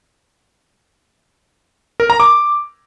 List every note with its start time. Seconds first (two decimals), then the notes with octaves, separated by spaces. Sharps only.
2.00 A#4
2.10 A#5
2.20 D6